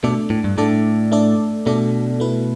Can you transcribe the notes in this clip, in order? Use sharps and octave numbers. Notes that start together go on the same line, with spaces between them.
B2 A3 D4 A4 D5
A2
G2
A2 A3 D4 A4 D5
A3 D4 A4 D5
B2 A3 D4 A4 D5
A3 E4 B4